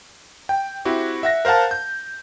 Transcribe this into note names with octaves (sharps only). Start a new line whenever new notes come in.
G5
C4 E4 F#4 G4
E5 F#5 A#6
A#4 C5 F5 F#5 A5
G6